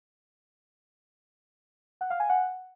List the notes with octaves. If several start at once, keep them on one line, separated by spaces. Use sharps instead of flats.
F#5
F5
G#5
F#5